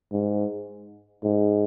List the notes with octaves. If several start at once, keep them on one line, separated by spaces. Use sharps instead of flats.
G#2
G#2